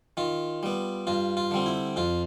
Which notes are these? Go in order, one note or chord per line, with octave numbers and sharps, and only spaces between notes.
D#3 F4
G3 B3
G2 F4
F4
D3 G3 C4
E4
F2 F4